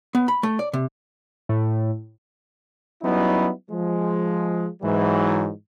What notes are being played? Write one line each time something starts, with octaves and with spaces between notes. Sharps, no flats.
B3
B5
A3
D5
C3
A2
F#3 G3 B3 C#4 D#4 E4
F3 G#3
G#2 E3 F#3